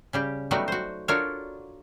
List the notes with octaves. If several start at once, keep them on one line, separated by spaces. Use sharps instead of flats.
C#3 G3 G4
F#3 G3 A3 B3 D#4 F#4
F#4 C5
D4 F4 F#4 A4 A#4 C#5